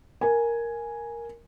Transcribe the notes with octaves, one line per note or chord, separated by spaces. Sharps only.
A#4 G#5